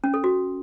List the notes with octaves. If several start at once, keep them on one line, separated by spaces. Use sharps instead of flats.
C#4
A4
F#4